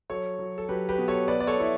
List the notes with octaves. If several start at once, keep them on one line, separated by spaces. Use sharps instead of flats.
F#3 A4 C#5
F#3
A4
F#3 G4 B4
G4 B4
B2
A4 C#5
B2 B4 D5
D5
A4 C#5
B2 E4